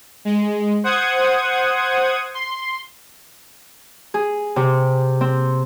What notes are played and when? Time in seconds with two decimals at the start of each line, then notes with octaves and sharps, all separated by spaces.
0.25 G#3
0.83 C5 F#5 D#6 G#6
2.35 C6
4.14 G#4
4.56 C3
5.21 C4